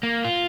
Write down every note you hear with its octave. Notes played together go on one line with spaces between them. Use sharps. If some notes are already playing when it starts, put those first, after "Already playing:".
A#3
F4